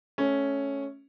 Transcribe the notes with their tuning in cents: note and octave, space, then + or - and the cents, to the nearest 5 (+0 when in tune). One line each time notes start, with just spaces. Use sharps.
A3 -15 C#4 +0